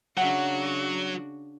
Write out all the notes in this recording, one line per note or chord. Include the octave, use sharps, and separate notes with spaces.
C#3 F#3 D4 F#4 E5 F#5